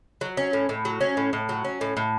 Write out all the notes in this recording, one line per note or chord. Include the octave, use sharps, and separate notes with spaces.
F#3
C#4
A2
A2
F#3
C#4
A2
A2
F#3
C#4
A2
A2